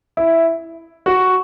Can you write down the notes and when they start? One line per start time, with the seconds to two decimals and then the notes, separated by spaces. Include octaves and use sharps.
0.17 E4
1.06 F#4